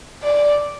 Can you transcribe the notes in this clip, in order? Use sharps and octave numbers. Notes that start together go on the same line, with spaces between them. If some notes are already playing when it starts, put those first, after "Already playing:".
D5